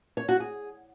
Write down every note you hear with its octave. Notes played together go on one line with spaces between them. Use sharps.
C#5
F#4
G#4